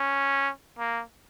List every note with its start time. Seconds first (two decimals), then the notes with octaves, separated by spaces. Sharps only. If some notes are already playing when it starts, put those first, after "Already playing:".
Already playing: C#4
0.79 A#3